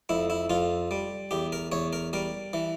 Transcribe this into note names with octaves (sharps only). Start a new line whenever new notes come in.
F2 E4
E4
F2 F4
G3
E2 G4
A#4
E2 C#5
A#4
G3 A#4
E3